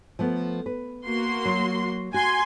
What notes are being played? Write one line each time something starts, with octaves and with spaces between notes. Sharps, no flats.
F3 A3 B3
B4
A#3 F#4 C6
F#3
F#4 G#5 C6